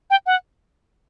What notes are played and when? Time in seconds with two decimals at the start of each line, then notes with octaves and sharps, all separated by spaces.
0.10 G5
0.26 F#5